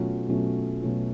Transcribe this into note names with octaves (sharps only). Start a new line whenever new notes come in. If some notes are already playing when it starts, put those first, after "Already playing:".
Already playing: B2 F#3 A3 C#4 F4
B2 F#3 A3 C#4 F4
B2 F#3 A3 C#4 F4